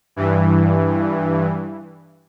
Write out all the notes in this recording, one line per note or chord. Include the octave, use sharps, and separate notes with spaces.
G2 E3